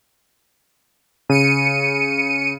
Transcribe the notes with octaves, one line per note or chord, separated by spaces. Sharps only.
C#3 C#7 D#7